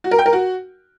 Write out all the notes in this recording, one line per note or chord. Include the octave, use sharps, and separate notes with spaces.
F#4
A#4
G5
A#4
F#4